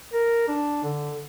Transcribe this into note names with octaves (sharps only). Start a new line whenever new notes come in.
A#4
D4
D3